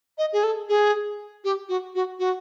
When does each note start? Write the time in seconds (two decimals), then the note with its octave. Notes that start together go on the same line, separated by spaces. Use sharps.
0.18 D#5
0.33 G#4
0.43 A4
0.69 G#4
1.44 G4
1.69 F#4
1.95 F#4
2.19 F#4